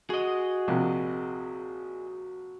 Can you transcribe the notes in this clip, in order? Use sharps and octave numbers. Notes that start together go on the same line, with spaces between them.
F#4 G#4 D#5
A#1 C3